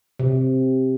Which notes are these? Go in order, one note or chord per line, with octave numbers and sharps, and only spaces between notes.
C3